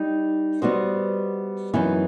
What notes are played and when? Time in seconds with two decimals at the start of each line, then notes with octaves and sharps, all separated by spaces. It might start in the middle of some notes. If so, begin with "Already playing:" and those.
Already playing: G3 D#4
0.62 G3 B3 F#4 C5 D#5
1.74 F#2 E3 B3 D#4